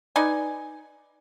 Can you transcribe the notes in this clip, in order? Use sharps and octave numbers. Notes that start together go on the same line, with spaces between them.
D#4 B4 D5 G#5